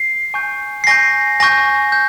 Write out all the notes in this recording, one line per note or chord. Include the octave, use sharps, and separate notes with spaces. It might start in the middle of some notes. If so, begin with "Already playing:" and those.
Already playing: C7
G#5 C#6 G6
C7
G#5 C#6 G6 A#6
G#5 C#6 G6 A#6
G6